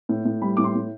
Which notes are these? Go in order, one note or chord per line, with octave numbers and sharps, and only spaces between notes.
A2
A2
G3 B5
A2 D6
C6
A2